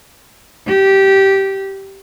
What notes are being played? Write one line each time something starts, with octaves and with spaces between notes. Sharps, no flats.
G4